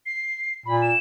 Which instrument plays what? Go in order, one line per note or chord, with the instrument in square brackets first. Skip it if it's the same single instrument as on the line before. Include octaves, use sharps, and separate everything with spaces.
[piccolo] C7
[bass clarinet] A#2 [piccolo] B5
[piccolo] E7